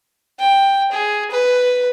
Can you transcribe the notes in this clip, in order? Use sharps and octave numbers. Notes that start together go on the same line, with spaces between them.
G5
G#4
B4